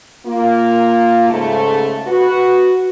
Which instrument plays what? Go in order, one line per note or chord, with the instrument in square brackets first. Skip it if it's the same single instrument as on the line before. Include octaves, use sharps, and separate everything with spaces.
[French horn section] A#3 F4
G#2 C#3 A3
F#4 B4